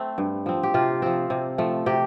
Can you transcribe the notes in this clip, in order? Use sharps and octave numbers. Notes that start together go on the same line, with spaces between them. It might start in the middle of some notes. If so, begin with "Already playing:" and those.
Already playing: A3 C4
G2
F3 C4
G4
C3 F4
F3 C4
C3
F3 A3
C3 G4